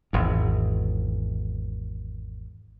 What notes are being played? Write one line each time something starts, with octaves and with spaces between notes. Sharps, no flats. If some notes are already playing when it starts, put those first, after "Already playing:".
G#1 E2